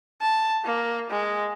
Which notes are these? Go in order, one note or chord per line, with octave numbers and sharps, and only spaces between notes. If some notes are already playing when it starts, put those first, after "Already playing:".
A5
A#3
G#3